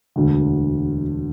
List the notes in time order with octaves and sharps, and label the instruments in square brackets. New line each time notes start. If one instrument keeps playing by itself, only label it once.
[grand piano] E1 D2 D3